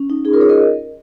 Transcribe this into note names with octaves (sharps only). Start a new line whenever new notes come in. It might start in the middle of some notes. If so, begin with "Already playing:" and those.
Already playing: C#4
D#4
D#4 G#4
F4 A#4
G#4 C#5
A#4 D#5